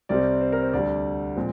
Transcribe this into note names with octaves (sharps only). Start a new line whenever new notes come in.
C2 C3 G3 C4 D5
C5
A#4
C5
D2 D3 G3 D5
A#2 F3 G#3 C4